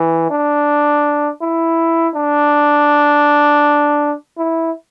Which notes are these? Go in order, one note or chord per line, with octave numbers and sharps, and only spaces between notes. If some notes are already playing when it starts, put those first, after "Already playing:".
Already playing: E3
D4
E4
D4
E4